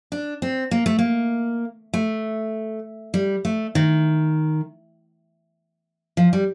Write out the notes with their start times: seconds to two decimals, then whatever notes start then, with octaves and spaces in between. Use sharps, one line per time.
0.12 D4
0.42 C4
0.71 A#3
0.86 A3
0.99 A#3
1.94 A3
3.14 G3
3.45 A3
3.75 D#3
6.17 F3
6.33 G3